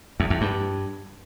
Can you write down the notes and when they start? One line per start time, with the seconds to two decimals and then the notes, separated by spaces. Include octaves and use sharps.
0.20 E2
0.30 E2
0.41 G2